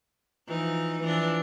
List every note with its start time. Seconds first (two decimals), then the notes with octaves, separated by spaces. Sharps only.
0.47 E3 F3 D#4
1.02 E3 F3 D4